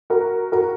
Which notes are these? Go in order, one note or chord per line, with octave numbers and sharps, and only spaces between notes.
F#4 A#4
F#4 A#4